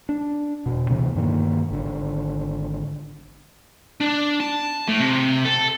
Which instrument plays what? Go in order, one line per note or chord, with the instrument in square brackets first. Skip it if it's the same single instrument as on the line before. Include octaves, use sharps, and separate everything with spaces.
[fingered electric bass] D4
E1 G#2 B2
D2 C3 E3 B3
G2 A#2 D#3 A#3
G#1 D3
[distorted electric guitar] D4
A5
A2
C3
A4